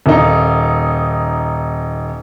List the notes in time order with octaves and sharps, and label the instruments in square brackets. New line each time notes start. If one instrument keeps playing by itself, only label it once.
[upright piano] D#1 D#4